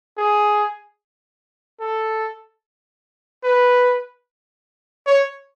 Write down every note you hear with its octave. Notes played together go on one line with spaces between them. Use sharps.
G#4
A4
B4
C#5